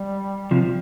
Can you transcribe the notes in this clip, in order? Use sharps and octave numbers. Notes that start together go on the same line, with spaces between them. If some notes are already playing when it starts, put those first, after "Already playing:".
Already playing: G3
C3 F3